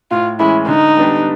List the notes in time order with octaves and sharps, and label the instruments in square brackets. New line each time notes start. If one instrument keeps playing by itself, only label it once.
[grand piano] A2 [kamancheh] F4
[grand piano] E3 G#3 C#4 [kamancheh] E4
[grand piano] D3 [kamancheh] D#4
[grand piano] G3 B3 D4 G4